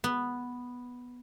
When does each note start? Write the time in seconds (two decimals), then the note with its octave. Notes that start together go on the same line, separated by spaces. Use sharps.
0.04 B3